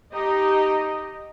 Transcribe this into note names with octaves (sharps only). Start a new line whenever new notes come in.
D#4 G4 D#5